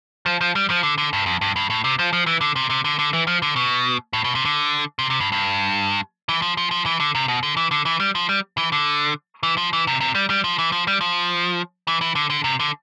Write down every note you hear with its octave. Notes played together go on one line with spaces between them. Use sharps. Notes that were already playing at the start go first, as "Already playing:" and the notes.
F3
F3
G3
F3
D3
D3
G2
F2
G2
G2
A2
C3
F3
F3
E3
D3
C3
C3
D3
D3
E3
F3
D3
B2
A2
B2
C3
D3
C3
C3
G2
G2
E3
F3
F3
F3
E3
D3
C3
B2
D3
E3
D3
E3
G3
F3
G3
E3
D3
E3
F3
E3
C3
C3
G3
G3
F3
E3
F3
G3
F3
E3
E3
D3
D3
C3
D3